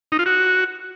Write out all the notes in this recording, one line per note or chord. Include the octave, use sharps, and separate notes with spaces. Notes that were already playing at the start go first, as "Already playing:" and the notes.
D#4
F4
F#4